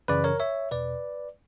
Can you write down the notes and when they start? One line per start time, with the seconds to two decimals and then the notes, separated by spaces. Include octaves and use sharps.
0.08 F#2 C#3 E3 B4 D5
0.24 A#4 C#5
0.40 C#5 E5
0.71 E2 B2 B4 D5